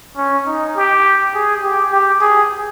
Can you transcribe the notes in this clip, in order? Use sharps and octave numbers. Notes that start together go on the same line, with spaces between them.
C#4
D#4
G4
G#4
G4
G4
G#4